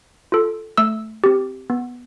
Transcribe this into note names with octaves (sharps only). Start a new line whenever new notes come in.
F4 A4
A3 E6
C4 G4
B3